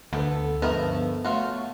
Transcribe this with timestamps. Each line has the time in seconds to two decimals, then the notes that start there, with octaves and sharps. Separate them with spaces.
0.13 D2 B3 A4
0.62 G2 D3 F3 A3 B3 A#4 D#5
1.24 F#3 A3 F4 F#4